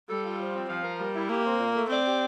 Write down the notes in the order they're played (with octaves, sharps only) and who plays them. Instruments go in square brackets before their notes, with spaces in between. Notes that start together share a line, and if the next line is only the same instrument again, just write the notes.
[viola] G3 [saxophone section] A4
[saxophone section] F4
F3
C4
[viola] F3 [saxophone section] F5
[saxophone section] A#4
[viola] G3 [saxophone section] A#3
[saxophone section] E4
[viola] A#3 [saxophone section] G4
[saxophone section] C4
A#2
A3
[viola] C4 [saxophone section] D5
[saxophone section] G4